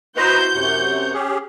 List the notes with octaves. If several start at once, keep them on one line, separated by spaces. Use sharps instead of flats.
E4 F#4 B4 C5 D#5 A#5 G6
F#2 C3 C#5 F#5
C#4 G4 G#4